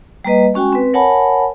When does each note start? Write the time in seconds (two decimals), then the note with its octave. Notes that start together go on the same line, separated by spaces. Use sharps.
0.25 G3 A#3 B4 D#5
0.54 G#3 C#4 F#4 G5 G#5
0.73 C4 B4
0.93 A#4 C#5 F#5 G#5 A5 B5